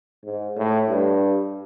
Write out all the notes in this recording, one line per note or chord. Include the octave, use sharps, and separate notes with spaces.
G#2
A2
G2